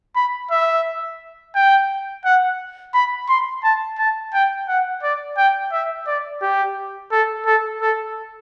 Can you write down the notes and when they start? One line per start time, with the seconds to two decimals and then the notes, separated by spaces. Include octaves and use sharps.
0.15 B5
0.51 E5
1.55 G5
2.25 F#5
2.94 B5
3.28 C6
3.63 A5
3.98 A5
4.33 G5
4.68 F#5
5.03 D5
5.37 G5
5.72 E5
6.07 D5
6.42 G4
7.11 A4
7.46 A4
7.81 A4